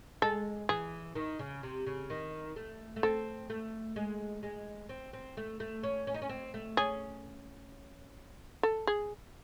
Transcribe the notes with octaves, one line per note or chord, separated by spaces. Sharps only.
G#3 A4
E3 G#4
D#3
C#3
C3
C#3
D#3
A3
A3
C4 A4
A3
G#3
G#3
C4
C4
A3
A3
C#4
C#4
D#4
C#4
C4
A3
C#4 G#4
A4
G#4